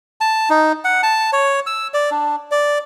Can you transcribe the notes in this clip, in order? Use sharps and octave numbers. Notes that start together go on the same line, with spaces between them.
A5
D#4
F#5
A5
C#5
E6
D5
D4
D5